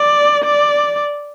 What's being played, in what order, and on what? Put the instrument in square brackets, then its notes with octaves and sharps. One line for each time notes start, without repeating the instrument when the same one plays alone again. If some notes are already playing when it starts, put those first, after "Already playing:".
Already playing: [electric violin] D5
D5